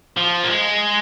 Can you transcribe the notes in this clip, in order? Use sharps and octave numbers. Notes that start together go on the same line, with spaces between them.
F3
A#3
G#3